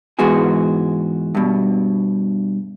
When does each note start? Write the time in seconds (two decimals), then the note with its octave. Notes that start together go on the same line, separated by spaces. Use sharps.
0.19 G#2 E3 G#3 B3 F#4 G#4
1.35 G2 B2